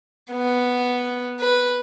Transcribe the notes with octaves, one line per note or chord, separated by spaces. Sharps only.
B3
B4